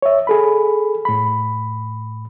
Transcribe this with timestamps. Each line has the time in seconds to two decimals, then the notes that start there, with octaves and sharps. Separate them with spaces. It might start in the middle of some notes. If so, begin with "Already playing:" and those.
0.02 C#5 E5
0.27 G#4 A4 B5
1.05 A2 B5